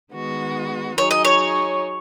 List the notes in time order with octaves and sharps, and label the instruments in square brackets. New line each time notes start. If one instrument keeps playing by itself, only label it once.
[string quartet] D#3 G#3 B3 F#4
[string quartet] F#3 D#4 G#4 [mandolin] C#5
[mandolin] D#5
C#5